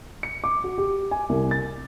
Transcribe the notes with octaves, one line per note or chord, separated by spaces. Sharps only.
C#7
D6
F#4
G4
G#5
C2
A6